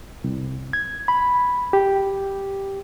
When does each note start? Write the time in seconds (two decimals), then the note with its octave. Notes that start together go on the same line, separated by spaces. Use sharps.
0.24 C2
0.73 G#6
1.08 B5
1.73 G4